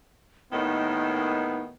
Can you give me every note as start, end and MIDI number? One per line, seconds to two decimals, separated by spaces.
0.53 1.70 39
0.53 1.70 45
0.53 1.70 51
0.53 1.75 59
0.53 1.61 63